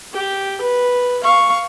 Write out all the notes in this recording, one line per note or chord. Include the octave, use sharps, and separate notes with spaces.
G4
B4
F5 C#6